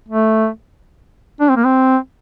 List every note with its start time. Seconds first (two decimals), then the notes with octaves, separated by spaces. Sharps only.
0.09 A3
1.40 D4
1.49 C4
1.57 A#3
1.65 C4